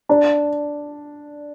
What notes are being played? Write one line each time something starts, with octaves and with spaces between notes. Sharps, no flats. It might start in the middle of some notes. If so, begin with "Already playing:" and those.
D4